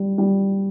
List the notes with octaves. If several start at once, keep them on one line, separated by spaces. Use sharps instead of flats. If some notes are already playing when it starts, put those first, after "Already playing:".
Already playing: G3
G3